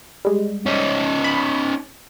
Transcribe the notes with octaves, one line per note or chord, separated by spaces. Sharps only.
G3 G#3
C#4 D#4
B5